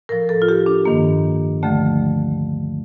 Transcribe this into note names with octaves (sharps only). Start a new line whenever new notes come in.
A2 F3 A#4
A4
F4
G4
D4
G2 D#3 A#3
D2 D3 F3 A3